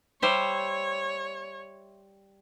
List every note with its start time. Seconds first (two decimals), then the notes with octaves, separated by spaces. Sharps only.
0.22 G3 C5 C#5 E5